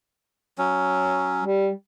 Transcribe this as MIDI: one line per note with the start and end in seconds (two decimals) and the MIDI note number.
0.58 1.44 54
0.58 1.44 61
1.44 1.70 55